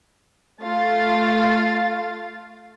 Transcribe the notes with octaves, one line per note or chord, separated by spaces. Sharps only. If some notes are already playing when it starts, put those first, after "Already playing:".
A3 F4 F5 A6